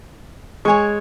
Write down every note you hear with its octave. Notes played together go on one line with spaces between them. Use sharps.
G#3 C#5 G#5 C#6